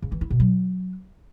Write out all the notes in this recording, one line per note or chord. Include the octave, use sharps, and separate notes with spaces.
C#3
E3
E4
B2
F#3